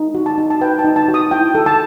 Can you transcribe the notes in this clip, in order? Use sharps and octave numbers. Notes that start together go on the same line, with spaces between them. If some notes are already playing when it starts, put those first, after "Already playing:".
Already playing: D#4
F#4
A5
D#4
A5
B4 G5
A5
D#4
A5
F#4
D#6
E4 G5
A4
A5